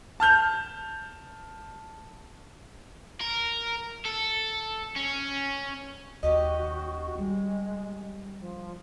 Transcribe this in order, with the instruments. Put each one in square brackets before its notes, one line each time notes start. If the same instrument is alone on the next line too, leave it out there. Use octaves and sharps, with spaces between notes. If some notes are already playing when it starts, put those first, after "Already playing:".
[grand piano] A5 F6 G6 F7
[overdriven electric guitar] A#4
A4
C#4
[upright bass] D#2 [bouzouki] C#4 G4 D#5 [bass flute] F#4
[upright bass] G3 [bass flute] G#3
[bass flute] F3